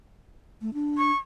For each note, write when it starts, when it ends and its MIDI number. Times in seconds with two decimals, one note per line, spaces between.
0.61 0.70 57
0.74 1.11 62
0.98 1.17 85